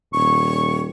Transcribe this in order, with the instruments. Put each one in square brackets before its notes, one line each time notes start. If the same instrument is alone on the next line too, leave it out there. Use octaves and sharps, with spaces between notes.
[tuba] D#1 [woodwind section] C#6